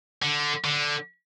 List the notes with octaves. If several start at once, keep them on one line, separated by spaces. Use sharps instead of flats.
D3
D3